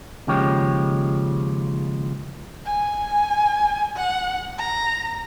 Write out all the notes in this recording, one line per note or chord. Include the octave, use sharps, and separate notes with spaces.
D#2 C#3 F3 G#3 G4 C#5
G#5
F#5
A#5